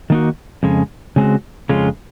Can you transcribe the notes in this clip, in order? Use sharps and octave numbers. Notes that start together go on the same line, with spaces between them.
D#3 A#3 D#4 F#4
F2 C#3 G#3
C#3 G#3 C4 F#4
F2 C#3 G#3 C#4 F4